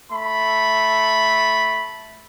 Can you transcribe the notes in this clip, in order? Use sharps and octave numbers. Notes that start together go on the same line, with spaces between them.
A3 B5